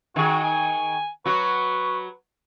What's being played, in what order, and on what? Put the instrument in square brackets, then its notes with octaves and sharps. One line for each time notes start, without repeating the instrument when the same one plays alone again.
[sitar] D#3 G#4 [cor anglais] F#4
[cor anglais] G#5
[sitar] F#3 F#4 [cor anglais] B4 [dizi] C#6